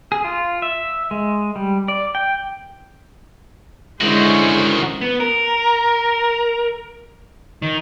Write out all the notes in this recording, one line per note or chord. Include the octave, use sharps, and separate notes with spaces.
G#4
F4
E5
G#3
G3
D5
G5
D3 D#3 G#3 C#4 E4 F#4 C5
B3
A#4
D#3